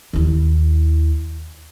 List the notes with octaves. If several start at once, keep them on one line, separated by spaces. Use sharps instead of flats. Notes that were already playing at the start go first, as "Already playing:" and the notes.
D#2 E4